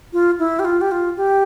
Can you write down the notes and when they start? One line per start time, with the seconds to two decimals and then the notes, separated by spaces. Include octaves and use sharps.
0.13 F4
0.39 E4
0.59 G4
0.65 F4
0.81 G4
0.91 F4
1.17 G4